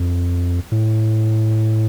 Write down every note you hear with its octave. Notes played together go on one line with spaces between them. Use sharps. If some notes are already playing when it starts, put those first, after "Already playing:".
Already playing: F2
A2